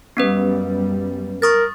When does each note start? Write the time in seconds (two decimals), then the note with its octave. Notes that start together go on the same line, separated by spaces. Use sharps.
0.17 F#2 G3 B3 C#4 B4
1.42 A#4 C#6 D#6 A6